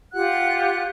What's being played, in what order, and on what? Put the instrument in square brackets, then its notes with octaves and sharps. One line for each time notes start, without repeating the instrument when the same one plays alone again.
[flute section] F4 G4 F#5 F#6